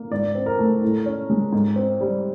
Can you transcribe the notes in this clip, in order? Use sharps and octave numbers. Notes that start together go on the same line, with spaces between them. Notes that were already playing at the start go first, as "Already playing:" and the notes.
Already playing: A#3
G#2 D5
C4
A#4
A3
A2
C#4
G#3
G#2
C4
G3